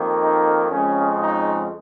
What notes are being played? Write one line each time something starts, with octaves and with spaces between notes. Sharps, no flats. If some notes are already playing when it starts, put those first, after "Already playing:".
Already playing: F2 D#3 A#3
D#4
F2 C#3 G#3 C#4
D#4